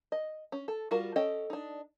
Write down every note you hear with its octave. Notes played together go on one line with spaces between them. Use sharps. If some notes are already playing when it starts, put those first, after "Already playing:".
D#5
C#4
A4
G3 F4 F#4 A#4
C#4 A4 D#5 G5
D4 D#4